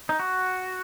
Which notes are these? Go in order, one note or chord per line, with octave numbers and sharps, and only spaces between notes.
D#4
F#4